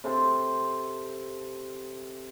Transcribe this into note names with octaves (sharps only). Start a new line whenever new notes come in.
C3 A4 C5 A5